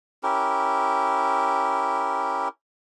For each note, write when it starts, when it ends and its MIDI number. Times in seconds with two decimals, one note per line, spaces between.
0.23 2.48 61
0.23 2.48 64
0.23 2.48 67
0.23 2.48 70